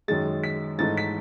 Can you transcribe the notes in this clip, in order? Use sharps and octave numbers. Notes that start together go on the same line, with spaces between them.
F#2 D#3 G#3 A6
B6
G#2 E3 A3 D#4 A6
B6